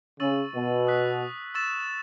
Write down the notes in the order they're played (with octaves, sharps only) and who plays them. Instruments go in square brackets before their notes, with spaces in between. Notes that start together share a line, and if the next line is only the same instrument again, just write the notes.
[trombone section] C#3 [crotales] C#6 E6 A6 D#7 F#7
[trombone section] B2
[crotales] D#6 F#6 B6
C#6 E6 A6 E7